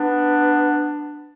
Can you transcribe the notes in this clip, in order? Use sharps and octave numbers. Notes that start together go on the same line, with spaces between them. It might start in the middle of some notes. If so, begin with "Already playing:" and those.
Already playing: B3 D4